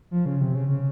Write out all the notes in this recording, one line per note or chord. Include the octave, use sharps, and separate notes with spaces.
F3
C#3
C3
C#3
C#3